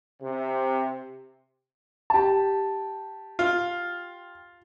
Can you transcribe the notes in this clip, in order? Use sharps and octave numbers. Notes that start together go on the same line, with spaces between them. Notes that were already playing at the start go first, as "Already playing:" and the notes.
C3
G4 A5
F4